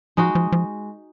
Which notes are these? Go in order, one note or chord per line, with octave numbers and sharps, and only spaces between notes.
F3 G#3 D#4 F#4
F3
F3